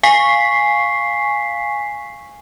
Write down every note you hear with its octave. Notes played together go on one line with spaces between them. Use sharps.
F5 G#5 C#6 B6 C7